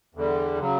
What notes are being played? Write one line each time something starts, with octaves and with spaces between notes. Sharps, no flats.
E2 D3 G3
C#3 F#3